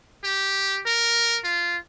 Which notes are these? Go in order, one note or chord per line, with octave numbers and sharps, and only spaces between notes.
G4
A#4
F4